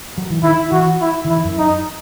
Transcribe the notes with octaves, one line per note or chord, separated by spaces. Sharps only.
F#3
E3
D#3 E4
E3 F#4
E4
D#3
E3 E4
F#2
D#4